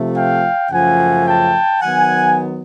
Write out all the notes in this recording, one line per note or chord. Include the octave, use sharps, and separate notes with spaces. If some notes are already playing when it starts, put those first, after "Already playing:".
Already playing: C3 F3 A3
F5 G5
F#2 C#3 F3 A3 F#5 G#5
G5 A5
D#3 F#3 B3 F#5 G#5